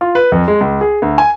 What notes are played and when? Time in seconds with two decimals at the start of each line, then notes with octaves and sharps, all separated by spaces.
0.01 F4
0.15 B4
0.32 F2
0.48 G#3
0.61 C#2
0.81 G#4
1.02 D2
1.18 G#5